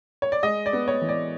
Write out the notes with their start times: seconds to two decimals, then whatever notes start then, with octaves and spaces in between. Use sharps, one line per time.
0.22 C#5
0.32 D5
0.43 G#3 D#5
0.66 D5
0.73 B3
0.88 C#5
1.02 E3
1.09 D5